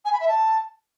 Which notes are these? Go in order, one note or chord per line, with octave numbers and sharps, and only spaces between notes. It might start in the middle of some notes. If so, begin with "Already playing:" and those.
G#5
B5
E5
A5